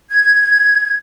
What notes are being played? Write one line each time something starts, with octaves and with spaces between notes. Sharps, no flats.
G#6